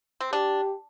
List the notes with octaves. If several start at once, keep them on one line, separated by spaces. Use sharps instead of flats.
C4
D4 G4